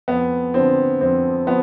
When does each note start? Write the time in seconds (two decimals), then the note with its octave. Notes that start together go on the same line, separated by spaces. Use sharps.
0.08 F2 B3
0.54 D3 F3 C4
1.01 F2 C4
1.47 F3 B3